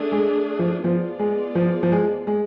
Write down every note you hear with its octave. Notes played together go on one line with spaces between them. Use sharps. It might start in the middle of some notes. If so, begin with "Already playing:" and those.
Already playing: A3 D4 G#4
G#3
F3
F3 B3 F4 G#4 D5
G#3
F3
F3
G#3
G#3